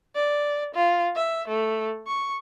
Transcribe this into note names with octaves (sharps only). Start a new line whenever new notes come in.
D5
F4
E5
A3
C#6